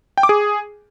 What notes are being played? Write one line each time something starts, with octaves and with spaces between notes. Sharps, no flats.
G5
D6
G#4